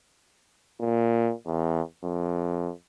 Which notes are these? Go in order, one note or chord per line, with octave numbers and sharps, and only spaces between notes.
A#2
E2
F2